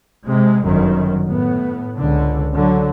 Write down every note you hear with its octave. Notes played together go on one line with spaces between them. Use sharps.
C3 G#3
G1 F#2 D#3
A2 B3
C#2 D3
D3 F#3